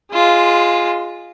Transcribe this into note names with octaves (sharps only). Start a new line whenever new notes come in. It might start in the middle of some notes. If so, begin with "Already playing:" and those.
G#3 F4